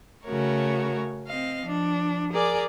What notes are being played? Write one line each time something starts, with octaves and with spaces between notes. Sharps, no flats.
C#3 A3 F#4 A#4 C#5
C4 D#5 F5
F3 D4
G#4 A#4 D5 G#5 D6